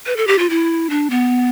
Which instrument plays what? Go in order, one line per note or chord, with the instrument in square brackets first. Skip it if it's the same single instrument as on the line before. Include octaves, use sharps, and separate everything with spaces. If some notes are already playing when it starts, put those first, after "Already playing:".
[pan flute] B4
A4
G4
F4
E4
D4
B3